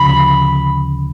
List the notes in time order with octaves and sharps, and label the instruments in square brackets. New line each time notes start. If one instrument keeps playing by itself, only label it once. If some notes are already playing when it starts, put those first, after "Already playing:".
Already playing: [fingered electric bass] D2 C#3 F3 [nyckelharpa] B5